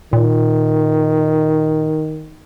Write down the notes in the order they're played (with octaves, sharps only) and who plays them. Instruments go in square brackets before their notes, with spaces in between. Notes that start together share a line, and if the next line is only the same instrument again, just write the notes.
[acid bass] A#2 [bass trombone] D#3